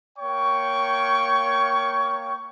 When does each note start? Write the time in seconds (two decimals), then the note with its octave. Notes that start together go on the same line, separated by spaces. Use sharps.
0.19 A#3 C#5 G5 C#6